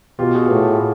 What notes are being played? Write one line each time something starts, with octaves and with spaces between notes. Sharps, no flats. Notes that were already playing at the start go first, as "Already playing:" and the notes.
B2 F4 G4
F#4 G#4
A2